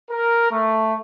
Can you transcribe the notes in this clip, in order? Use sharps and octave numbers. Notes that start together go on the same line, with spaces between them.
A#4
A3